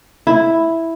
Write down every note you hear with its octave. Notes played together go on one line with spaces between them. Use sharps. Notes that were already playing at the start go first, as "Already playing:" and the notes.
E4